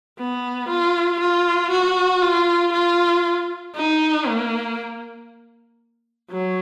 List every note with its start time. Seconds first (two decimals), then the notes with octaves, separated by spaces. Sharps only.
0.18 B3
0.69 F4
1.20 F4
1.71 F#4
2.22 F4
2.73 F4
3.75 D#4
4.27 A#3
6.31 F#3